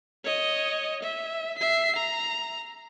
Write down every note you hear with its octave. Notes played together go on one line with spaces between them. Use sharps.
C#5 D#5
E5
E5 C7
A#5